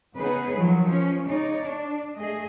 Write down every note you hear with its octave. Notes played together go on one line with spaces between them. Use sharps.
C#3 B3 D#4 G#4 B4
D#3 F3 F#3
F3 C#4
C#3 D#4 C#5 D5
D4
A3 G#4 D#5